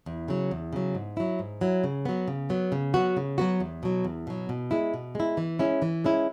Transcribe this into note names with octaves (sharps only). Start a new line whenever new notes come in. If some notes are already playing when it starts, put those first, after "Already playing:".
E2
C#3 F#3
E2
C#3 F#3
G#2
F#3 E4
G#2
F#3 E4
C#3
F#3 B3
C#3
F#3 B3
C#3
F#3 B3 F#4
C#3
F#3 B3 F#4
E2
B2 F#3
E2
B2 F#3
B2
G#3 E4
B2
G#3 E4
E3
G#3 C#4 E4
E3
G#3 C#4 E4